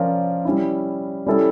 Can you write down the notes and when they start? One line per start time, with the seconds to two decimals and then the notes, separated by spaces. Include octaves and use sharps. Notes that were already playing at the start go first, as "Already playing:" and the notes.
Already playing: F3 C#4 F4 A#4 D5
0.45 G3 C#4 E4
1.26 G3 C#4 E4 A4